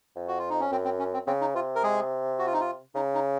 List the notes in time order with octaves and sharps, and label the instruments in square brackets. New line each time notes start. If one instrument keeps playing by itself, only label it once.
[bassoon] F2
[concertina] F#4
F4
D#4
C#4
[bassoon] F#2 [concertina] C4
[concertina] C4
C#4
C4
[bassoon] C#3 [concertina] C4
[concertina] D#4
[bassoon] C3 [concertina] F4
[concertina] A#4
G#3 G#4
F#4
F4
D#4
F4
[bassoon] C#3 [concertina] D#4
[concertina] D#4